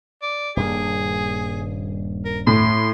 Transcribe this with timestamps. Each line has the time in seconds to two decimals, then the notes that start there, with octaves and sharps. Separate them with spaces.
0.22 D5
0.57 D#1 G2 A#3 G#4
2.25 A#4
2.47 A2 C6